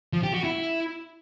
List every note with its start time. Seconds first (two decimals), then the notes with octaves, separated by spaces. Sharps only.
0.13 F3
0.23 G4
0.34 F#4
0.44 E4